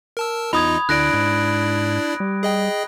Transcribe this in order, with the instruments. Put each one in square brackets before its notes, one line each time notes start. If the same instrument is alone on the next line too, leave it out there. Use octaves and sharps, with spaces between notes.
[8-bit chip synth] A#4 A5 E6
[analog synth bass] E2 [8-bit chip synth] D#4 F4 D#5 [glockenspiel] B5 D#6 G#6
[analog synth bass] D2 [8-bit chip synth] D4 E4 D5 [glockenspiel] F#6 A#6 D7
[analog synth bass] G#2
G3
[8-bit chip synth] G#4 D#5 G5